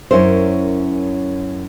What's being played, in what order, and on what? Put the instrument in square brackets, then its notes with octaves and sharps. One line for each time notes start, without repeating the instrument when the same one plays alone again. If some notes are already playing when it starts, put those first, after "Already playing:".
[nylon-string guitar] F#2 C#4 E4 A#4 C5